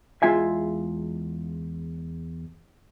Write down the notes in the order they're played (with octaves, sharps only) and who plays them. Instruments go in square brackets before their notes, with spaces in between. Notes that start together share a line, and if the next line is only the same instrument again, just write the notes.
[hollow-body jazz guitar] E2 G#3 F4 E5 G#5